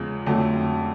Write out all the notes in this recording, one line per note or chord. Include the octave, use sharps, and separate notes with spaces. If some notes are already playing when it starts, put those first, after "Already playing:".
Already playing: E2 C#3 F3 G#3
F2 D3 F#3 A3